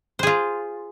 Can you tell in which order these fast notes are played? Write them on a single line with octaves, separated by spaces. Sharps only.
C5 G#4 F4